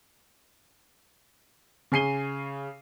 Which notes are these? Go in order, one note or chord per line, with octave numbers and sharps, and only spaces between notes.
C#3 G#4 C7 D#7 G7